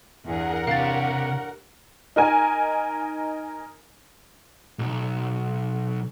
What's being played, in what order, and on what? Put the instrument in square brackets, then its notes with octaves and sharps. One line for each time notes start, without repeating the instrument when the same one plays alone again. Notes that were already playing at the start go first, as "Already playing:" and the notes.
[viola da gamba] E2 G2 G#4 [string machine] A#4 F#5
[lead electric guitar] C3 [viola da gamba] D4 G4 C#5 [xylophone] F5 A6
[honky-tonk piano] D#4 A#4 G#5
[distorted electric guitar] B1